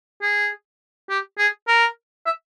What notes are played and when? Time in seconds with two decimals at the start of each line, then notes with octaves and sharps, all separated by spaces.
0.22 G#4
1.10 G4
1.38 G#4
1.68 A#4
2.26 E5